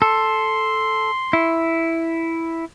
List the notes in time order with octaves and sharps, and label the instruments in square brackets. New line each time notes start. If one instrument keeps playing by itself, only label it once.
[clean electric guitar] A4 [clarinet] C6
[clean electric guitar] E4